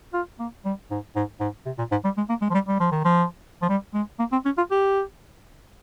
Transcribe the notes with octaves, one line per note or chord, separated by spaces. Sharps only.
F4
A#3
G3
G#2
G#2
G#2
C3
A#2
G#2
G3
G#3
A#3
G#3
F3
G3
G3
F3
D#3
F3
F3
G3
G#3
A#3
C4
C#4
F4
G4